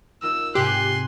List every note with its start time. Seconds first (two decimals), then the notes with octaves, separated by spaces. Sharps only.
0.22 D#4 F4 A#4 E6
0.55 G#2 C3 G4 G#5 C6 F#6